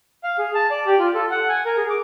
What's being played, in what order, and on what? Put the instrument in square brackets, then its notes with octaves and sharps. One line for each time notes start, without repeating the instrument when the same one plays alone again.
[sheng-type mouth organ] F5
G#4
A5
D5
G4
F4
A4
F#5
G#5
A#4
G#4
D6